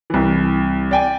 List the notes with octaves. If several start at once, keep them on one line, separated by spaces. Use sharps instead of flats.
C2 E3
D5 G5 G#5